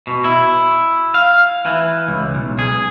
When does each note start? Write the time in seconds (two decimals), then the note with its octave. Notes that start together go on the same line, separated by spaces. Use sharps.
0.07 B2
0.24 E4
1.14 F5
1.66 E3
2.08 C#2
2.35 B1
2.59 G#4